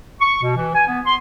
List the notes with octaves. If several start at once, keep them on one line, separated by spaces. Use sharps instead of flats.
C#6
B2
E3
G#5
B3
C6